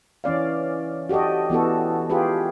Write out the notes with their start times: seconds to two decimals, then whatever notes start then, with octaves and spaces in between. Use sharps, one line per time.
0.24 E3 C#4 D5 F5
1.09 F#4 G4 A4 D5 D#5
1.50 E3 B3 F#4 A4
2.10 F4 G4 G#4 B4